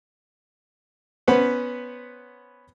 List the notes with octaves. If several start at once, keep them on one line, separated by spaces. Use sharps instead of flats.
B3 C#4 B4 C5 F#5